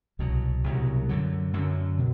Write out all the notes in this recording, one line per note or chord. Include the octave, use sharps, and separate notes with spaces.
C2 B2 F#3
C2 B2 F#3
F#2 D3 F#3
F#2 D3 F#3
B2